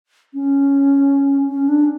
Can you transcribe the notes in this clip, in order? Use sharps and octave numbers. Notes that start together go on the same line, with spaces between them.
C#4
C#4
D4